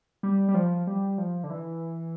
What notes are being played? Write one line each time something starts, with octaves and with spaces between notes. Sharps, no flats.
G3
G3
F3
G3
F3
D3
E3